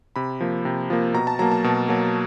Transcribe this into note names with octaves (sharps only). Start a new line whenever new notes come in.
C3 B5
F3 A#3
C3
F3 A#3
B2 A#5
A5
F#3 A#3 A#5
A5
B2
F#3 A#3